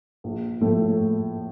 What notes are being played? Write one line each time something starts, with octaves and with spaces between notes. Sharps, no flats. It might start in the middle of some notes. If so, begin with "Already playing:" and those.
A#1
A2 F3 A3